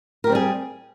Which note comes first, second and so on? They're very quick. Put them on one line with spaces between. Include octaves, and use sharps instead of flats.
A#4 G4 C4 G3 G#4